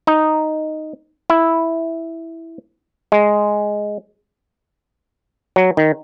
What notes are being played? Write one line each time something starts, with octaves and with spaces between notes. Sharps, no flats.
D#4
E4
G#3
F#3
D#3